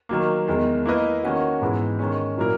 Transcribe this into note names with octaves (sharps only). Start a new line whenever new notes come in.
D#3 F#3 A#3
E2 D#3 G#3
A#3 E4 B4 D#5
D#3 A#3 C#4 F#4
G#2 E3 G#3 B3 E4
D#3 G#3 C#4
A#2 F#3 A#3 E4 A#4